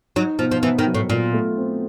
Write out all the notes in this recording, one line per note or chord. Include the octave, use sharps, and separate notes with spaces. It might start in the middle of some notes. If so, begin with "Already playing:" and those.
F#3 D#4
B2 F3
F3
E3 B3
D#3
F#3
A2
A#2 F4
A3
C4